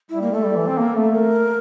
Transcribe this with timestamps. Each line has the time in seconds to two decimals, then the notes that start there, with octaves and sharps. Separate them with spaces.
0.10 G3 E4
0.22 A#3
0.33 A3 A4
0.45 G3
0.56 E3
0.67 C4
0.78 A#3
0.96 A3
1.13 A#4